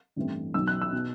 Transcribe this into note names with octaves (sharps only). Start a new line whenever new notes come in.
A1 G2 E3 A3 C4
B1 B2 F#3 E6
F#6
E6
B2